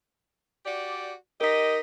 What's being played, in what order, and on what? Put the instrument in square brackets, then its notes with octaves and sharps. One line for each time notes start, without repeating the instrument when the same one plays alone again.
[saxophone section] F#4 G4 D5
[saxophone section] D#4 G4 D#5 [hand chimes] A#4 B6